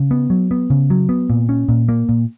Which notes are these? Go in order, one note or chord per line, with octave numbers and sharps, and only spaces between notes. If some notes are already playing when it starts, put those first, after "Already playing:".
Already playing: C#3
B3
F#3
B3
C#3
F#3
B3
A#2
C#4
A#2
A#3
A#2